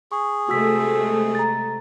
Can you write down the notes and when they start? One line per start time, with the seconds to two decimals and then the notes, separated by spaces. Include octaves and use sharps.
0.12 G#4 C#6
0.49 C3 G#3 A3 F#4 E6 B6
1.35 A#5 A6